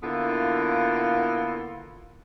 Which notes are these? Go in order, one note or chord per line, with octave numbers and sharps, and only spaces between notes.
D3 A#3 B3 E4 F4